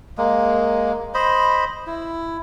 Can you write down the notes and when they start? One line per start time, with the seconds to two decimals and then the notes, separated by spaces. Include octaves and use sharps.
0.18 G#3 A#3
1.14 C5 D#5 B5
1.87 E4